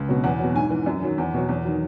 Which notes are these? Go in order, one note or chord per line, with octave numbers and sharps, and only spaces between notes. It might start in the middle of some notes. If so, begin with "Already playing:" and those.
Already playing: C#2
B2 F#3
E2 F#5
B2 F#3
G#2 G#5
E3
F#2
D#3 F#3
E2
B2 F#3
E2
D#3 F#3